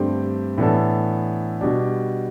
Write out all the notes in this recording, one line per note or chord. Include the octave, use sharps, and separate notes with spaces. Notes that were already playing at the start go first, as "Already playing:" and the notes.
Already playing: G2 D3 A3 C4 G4
A2 E3 B3 D4 A4
B2 G3 D4 G4